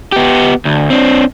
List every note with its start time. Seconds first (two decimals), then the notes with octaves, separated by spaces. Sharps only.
0.12 B3 G4
0.65 D2
0.90 C4 D4